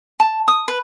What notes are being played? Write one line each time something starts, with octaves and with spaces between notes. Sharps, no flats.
A5
D#6
B4